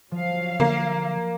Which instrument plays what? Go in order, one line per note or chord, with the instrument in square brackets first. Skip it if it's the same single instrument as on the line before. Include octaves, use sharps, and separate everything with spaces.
[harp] F3 [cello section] F#3 F5
[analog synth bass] D3 [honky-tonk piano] A#3